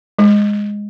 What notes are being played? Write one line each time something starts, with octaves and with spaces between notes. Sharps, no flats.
G#3